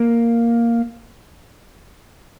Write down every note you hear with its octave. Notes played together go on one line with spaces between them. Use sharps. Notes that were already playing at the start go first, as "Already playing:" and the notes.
Already playing: A#3